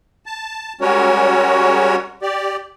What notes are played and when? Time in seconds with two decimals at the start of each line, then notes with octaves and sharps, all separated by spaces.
0.26 A5
0.81 G3 G#3 C#4 F#4 A#4 C#5
2.22 G4 D5